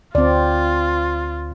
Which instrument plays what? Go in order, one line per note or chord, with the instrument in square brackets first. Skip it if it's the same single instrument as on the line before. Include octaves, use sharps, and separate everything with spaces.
[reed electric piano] D2 [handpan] C4 D5 [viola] F4